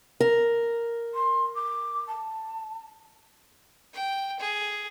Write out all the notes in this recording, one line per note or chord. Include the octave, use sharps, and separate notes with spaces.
A#4
C6
D6
A5
G5
G#4